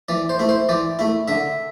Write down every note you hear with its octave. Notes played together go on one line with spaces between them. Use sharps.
E3 D5
C5
A3 E4
C5
E3 D5
A3 E4
D3 E5